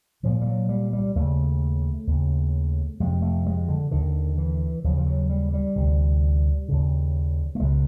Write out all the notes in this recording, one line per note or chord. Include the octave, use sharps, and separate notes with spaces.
C2 A#2 F3
G3
F#3
G3
G3
D#2 C#3 A3
D#2 C#3
F2 C3 G#3
A3
G#3
D3
D#2 D3 D#3
E3
D#2 C#3 F3
F3
F#3
G3
G3
D2 C3
D#2 C#3
A3
C#2 B2 G#3